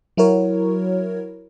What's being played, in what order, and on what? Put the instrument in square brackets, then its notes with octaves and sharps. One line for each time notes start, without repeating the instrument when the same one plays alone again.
[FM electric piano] F#3 E4 F#4 A#4 C#5